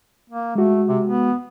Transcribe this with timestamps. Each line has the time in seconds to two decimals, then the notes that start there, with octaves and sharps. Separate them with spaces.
0.30 A#3
0.55 G#3 A3 F#4
0.88 C3
1.04 B3